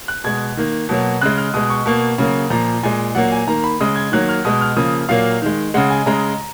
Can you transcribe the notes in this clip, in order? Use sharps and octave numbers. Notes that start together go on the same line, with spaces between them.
F#6
B2 G#3 G#6
D#3 A#3
B2 F#3 A#3
C#3 G#3 F#6
F6
B2 G#3 D#6
C#6
B2 A#3
C#3 F#3 A#3
A#2 F3 A#3 A#5
A#2 G#3 G#5
A#2 F#3 A#3 F#5
G#5
D#3 A#3 A#5
B5
C#3 G#3 D#6
G#6
D#3 F#3 A#3 F#6
F6
B2 G#3 D#6
F6
C#3 F3 A#3 D#6
A#2 F#3 A#3 F5
D#3 G#3
C#3 G#3 F#5
G#5
C#3 G#3 A#5